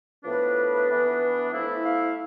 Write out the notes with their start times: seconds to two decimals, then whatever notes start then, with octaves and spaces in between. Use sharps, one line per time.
0.23 A2 F3 B3 D4 B4
0.88 E3 B3 D4
1.53 F3 A3 E4
1.84 F5